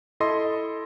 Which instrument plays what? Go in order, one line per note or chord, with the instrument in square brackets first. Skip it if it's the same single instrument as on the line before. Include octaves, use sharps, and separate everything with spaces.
[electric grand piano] E4 A4 D#5 C6